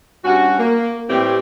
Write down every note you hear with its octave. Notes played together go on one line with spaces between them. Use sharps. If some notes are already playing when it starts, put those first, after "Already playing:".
G2 C#4 F#4
A#3
A2 E3 G3 C4 G4